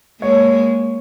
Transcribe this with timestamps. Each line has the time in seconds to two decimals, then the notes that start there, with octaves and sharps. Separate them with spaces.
0.21 G#3 A#3 C#5